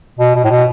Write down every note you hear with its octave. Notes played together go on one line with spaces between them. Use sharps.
B2
B2
A2
B2